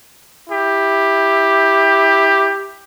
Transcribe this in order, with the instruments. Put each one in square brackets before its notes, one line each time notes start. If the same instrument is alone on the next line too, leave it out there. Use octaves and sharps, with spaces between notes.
[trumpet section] E4 G4